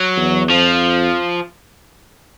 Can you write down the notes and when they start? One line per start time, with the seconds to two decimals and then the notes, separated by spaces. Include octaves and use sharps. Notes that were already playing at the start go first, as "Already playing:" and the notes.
Already playing: F#3
0.17 E2
0.49 F2 F3